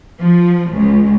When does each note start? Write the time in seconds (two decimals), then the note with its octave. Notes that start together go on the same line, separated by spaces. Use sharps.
0.20 F3
0.73 C#2